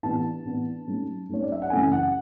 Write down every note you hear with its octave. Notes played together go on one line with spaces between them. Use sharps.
A2 E3 B3 D4 A5
A2 E3 B3 D4
G#2 F#3 A3 C#4
G#2 F#3 A3 C#4 C#5
D5
E5
F#5
F#2 C#3 E3 A3 C#4 G#5
F#5